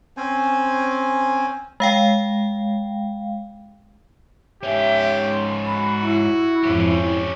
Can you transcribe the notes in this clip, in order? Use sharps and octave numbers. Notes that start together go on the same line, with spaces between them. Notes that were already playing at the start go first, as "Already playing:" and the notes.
C4 C#4 C5 G#5
G#3 F5 G5
G#2 C#4 G4 E5
C6
F#4 B5
E4
F2 G#2 C#4 G4